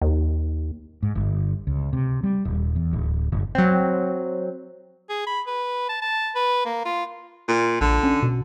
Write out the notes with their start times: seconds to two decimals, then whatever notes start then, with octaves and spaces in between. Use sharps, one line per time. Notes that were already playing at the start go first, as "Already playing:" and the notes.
0.02 D#2
1.03 G#2
1.15 G1
1.67 C#2
1.93 C3
2.23 G3
2.45 D#1
2.76 E2
2.93 D1
3.32 F#1
3.55 F#3 C4
5.09 G#4
5.27 B5
5.47 B4
5.89 A5
6.02 A5
6.35 B4
6.66 A#3
6.86 F4
7.48 A#2
7.81 A#1 D3
8.03 C#4
8.22 B2